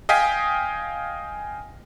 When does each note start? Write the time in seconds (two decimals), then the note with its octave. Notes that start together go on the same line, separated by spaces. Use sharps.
0.09 D#5 F5 G5 G#5 D#6 B6